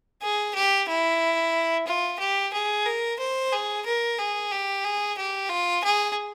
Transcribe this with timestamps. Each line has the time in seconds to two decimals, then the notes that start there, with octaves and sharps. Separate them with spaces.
0.22 G#4
0.55 G4
0.88 E4
1.87 F4
2.20 G4
2.53 G#4
2.86 A#4
3.19 C5
3.52 G#4
3.85 A#4
4.18 G#4
4.51 G4
4.84 G#4
5.18 G4
5.50 F4
5.84 G#4